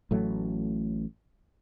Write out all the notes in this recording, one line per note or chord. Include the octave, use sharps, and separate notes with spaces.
A1 A2 F#3 A3